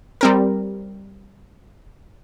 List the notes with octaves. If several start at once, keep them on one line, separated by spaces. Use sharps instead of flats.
G3 C4 A#4